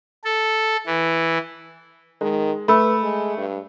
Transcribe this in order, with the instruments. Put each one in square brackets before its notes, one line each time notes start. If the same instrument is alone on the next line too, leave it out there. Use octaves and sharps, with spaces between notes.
[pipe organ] A4
E3
[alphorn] D#3 [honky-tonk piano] G#3
[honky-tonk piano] A3 [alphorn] B4 [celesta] B5 E6
[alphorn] G#3
G2